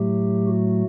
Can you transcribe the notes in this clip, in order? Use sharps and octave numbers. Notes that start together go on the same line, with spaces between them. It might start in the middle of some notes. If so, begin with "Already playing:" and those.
Already playing: A2 F#3 A3 G4
F#4